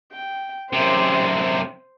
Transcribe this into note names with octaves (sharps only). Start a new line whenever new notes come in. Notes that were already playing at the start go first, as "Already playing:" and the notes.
G5
F#2 C3 C5